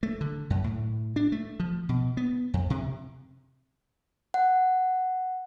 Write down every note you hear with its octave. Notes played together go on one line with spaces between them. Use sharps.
A3
D3
F#2
A2
D4
A3
F3
B2
B3
F2
C3
F#5